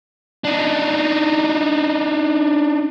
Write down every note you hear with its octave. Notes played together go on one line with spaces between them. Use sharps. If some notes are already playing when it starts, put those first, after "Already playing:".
D4 D#4